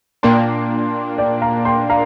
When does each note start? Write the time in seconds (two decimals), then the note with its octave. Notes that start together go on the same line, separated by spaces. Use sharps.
0.23 A#2 A#3 D4 G5 C6
1.18 D5 G5
1.42 F5 A#5
1.65 G5 C6
1.90 F5 A#5